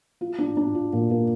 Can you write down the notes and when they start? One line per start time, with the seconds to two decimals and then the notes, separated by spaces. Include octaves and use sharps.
0.21 F4
0.39 D4
0.57 D4
0.75 F4
0.93 A#2
1.11 A#3